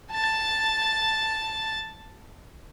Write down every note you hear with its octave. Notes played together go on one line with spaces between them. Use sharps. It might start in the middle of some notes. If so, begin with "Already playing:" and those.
A5 A6